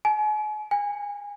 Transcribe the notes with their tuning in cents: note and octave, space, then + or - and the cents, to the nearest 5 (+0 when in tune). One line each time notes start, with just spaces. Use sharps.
G#5 +40
G#5 -25